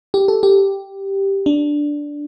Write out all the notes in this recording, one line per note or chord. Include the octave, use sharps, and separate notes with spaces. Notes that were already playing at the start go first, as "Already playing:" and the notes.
G4
A4
G4
D4